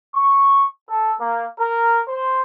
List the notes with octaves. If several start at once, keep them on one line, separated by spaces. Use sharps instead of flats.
C#6
A4
A#3
A#4
C5